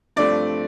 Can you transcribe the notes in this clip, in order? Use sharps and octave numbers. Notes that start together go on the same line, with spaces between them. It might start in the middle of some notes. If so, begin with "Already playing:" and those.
G2 F3 A3 C4 D5